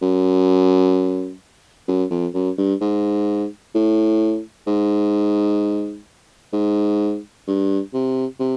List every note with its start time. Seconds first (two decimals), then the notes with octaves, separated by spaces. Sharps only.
0.02 F#2
1.88 F#2
2.11 F2
2.34 F#2
2.58 G2
2.81 G#2
3.75 A2
4.67 G#2
6.53 G#2
7.47 G2
7.94 C3
8.39 C3